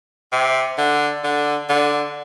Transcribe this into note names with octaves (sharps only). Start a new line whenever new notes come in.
C3
D3
D3
D3